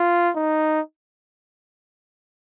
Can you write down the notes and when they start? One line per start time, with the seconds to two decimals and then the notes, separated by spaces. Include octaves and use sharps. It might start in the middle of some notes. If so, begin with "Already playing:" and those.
Already playing: F4
0.36 D#4